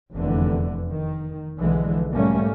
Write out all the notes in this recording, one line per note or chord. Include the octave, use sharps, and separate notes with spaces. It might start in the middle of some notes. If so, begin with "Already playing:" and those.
F1 E2 D3 E3
D#3
B1 D3 E3 F3 G#3
G#2 B2 G3 A3 A#3 C#4